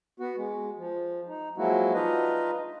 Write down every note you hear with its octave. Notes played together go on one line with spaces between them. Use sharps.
B3 F#4
G#3
F3
D#4
F3 F#3 G#3 A#3 E4 F#4
D4 D#4 F4 B4 D#5